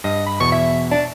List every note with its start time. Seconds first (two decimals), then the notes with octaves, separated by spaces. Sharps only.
0.04 G2 D#5
0.26 B5
0.40 E2 B2 C#6
0.52 E5
0.91 D4